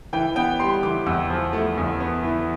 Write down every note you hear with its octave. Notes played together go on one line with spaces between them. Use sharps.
E3 G5
B3 G5
G3 C6
E3 D6
E2 E6
F3
A3
E2
B3
E3